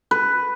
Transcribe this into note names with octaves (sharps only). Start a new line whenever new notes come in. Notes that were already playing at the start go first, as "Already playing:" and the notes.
B4